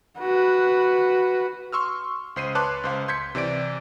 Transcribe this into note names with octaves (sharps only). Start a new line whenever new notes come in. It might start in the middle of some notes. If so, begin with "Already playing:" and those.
F#4 B4
C6 C#6 E6 F6
C#2 C5 C7 D#7
B4 C#5 A5 C6 D6 F#6
C#2 C5 F5
C6 G6 G#6 B6 C#7
C3 E3 D5 D7